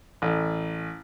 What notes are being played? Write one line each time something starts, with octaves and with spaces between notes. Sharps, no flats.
A1